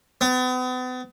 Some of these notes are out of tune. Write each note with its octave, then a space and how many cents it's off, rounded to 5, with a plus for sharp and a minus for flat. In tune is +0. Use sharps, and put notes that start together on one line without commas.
B3 +40